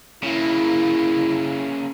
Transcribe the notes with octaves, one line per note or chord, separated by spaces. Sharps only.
C#3 A#3 E4